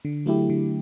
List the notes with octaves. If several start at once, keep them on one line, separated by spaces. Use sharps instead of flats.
D3
F#3 A3 E4 G4
D3